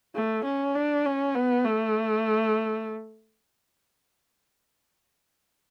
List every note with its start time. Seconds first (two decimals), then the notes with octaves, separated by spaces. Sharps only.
0.15 A3
0.45 C#4
0.75 D4
1.05 C#4
1.35 B3
1.64 A3